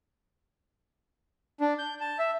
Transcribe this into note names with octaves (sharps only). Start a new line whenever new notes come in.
D4
G6
A5
E5